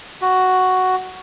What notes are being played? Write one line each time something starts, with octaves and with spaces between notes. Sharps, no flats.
F#4